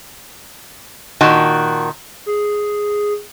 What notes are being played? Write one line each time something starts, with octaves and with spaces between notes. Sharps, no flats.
A#2 D#3 F#4 A5
G#4